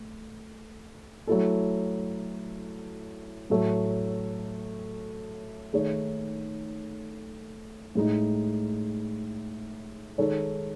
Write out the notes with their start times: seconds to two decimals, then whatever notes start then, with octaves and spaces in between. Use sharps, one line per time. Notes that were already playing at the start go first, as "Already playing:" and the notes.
Already playing: A3
1.27 F#3 A3 E4 A4
3.50 A2 F#3 A3
5.73 D#3 A3 D#4 G#4 C#5
7.95 A2 G#3 D#4
10.18 D#3 G#3 D#4 A4 C#5